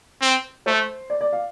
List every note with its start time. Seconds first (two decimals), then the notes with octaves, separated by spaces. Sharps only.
0.22 C4
0.66 A3 C5
1.10 D5
1.21 D5
1.33 F5